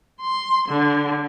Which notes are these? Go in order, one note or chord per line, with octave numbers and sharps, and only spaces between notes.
C6
D3